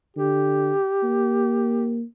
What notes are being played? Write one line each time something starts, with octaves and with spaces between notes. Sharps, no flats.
D3 G4
A#3